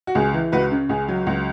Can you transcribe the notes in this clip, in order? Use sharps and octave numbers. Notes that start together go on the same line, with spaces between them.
F#4
C#2 G#4
E3
C#2 F#4 B4
C#3
C#2 G#4
F#3
C#2 F#4